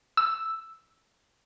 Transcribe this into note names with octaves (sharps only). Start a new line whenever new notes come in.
E6